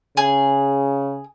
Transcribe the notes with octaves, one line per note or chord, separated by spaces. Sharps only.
C#3 G#4